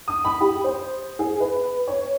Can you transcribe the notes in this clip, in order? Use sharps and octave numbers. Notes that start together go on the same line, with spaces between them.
D#6
B5
G4
C5
G#4
B4
C#5